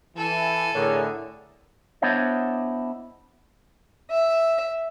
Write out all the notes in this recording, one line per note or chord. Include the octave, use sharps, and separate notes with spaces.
E3 A4 G#5
A2 D3 G#4 A#4 C#5
B3 D4 E4 C5 C#5 D#5
E5